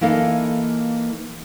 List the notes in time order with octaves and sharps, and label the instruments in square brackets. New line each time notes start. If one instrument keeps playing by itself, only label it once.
[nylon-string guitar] E3 A#3 D#4 A4 F5